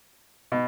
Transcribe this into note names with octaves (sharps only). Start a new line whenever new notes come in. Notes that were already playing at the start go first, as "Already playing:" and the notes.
B2